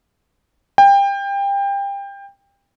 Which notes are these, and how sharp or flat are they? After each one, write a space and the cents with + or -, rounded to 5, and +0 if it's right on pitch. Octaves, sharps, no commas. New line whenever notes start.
G5 +25